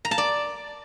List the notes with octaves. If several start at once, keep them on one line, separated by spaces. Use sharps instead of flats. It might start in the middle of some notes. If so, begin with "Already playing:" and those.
A#5
A5
D5